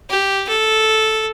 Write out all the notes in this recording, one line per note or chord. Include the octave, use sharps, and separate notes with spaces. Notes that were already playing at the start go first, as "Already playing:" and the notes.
G4
A4